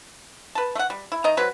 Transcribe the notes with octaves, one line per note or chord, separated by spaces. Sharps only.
B4 A5
A3 F#5
G3
E4
D#3 D#5 A#5
F#3 C4 B4